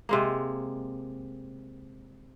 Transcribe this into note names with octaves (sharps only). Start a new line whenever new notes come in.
C3 G#3 A#3